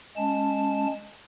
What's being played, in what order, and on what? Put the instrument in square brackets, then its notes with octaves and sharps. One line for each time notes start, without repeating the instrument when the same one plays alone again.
[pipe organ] G#3 C#4 A5